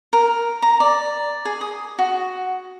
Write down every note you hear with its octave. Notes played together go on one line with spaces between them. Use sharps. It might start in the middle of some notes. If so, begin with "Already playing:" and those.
A#4
A#5
D5
G#4
D#6
F#4